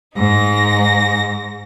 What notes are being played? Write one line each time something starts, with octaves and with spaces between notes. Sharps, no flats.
G#2 D#4 A#6